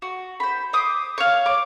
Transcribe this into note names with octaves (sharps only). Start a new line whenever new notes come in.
F#4
C5 B5
C5 D6 D#6
C#5 F5
D6